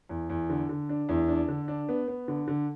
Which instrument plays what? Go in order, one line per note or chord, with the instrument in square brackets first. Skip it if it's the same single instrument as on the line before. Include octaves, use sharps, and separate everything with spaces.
[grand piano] E2
E2
D3
D3
D4
E2
D4
D3
D4
B3
B3
D3
D3